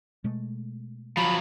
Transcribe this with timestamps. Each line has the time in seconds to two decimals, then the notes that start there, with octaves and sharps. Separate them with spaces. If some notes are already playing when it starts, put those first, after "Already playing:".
0.24 B2 G#3 A3
1.17 F3 F#3 B5